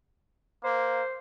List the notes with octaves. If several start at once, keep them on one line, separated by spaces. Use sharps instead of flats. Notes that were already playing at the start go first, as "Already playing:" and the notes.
A#3 C5